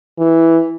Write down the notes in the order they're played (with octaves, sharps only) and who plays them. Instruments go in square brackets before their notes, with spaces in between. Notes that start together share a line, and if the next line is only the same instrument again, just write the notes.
[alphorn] E3